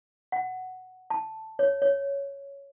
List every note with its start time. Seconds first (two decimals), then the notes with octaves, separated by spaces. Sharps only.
0.32 F#5
1.10 A5
1.59 C#5
1.82 C#5